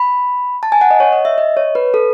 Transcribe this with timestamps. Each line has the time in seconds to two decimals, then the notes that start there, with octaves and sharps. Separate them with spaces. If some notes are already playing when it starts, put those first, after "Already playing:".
Already playing: B5
0.63 A5
0.72 G#5
0.81 F#5
0.90 D#5
1.00 C#5
1.12 D#5
1.25 E5
1.38 D#5
1.57 C#5
1.75 B4
1.94 A4